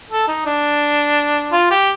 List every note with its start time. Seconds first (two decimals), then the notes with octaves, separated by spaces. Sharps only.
0.10 A4
0.28 D#4
0.46 D4
1.52 F4
1.71 G4